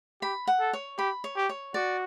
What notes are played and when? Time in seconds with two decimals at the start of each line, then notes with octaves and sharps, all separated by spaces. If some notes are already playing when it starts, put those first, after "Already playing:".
0.22 G4 B5
0.47 F#5
0.60 A4
0.73 C#5
0.98 G4 B5
1.24 C#5
1.37 G4
1.49 C#5
1.74 F#4 D5